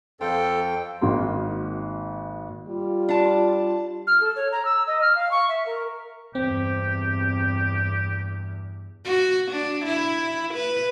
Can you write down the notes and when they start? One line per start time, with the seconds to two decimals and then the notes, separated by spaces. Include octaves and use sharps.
0.21 F2 A4 C5 F5 G5
1.01 G#1 D#3 A#3 F#4 C6
2.68 G3 F4
3.09 D4 A5
4.07 F6
4.20 A4
4.36 C#5
4.52 A#5
4.65 E6
4.87 D#5
5.02 F6
5.15 F5
5.31 C#6
5.49 E5
5.66 A#4
6.35 E2 G2 C4 G4
9.05 F#4
9.51 D4
9.85 E4
10.54 B4